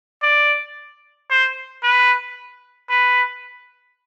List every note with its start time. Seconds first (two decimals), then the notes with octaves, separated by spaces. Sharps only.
0.23 D5
1.30 C5
1.83 B4
2.89 B4